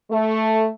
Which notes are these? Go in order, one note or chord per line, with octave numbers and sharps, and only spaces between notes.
A3